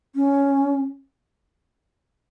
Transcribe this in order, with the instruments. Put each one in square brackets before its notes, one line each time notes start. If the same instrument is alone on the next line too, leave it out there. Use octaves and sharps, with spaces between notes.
[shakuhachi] C#4